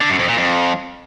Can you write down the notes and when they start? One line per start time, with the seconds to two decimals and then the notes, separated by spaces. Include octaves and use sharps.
0.01 D3
0.10 F#2
0.19 F2
0.28 A#2
0.37 F2